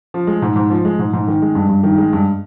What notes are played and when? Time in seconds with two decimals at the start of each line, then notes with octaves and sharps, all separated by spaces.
0.14 F3
0.27 G#3
0.42 G#2
0.56 G#2
0.70 F3
0.85 G#3
0.99 G#2
1.13 G#2
1.28 D#3
1.42 G#3
1.55 G2
1.69 G2
1.83 D#3
1.98 G#3
2.13 G2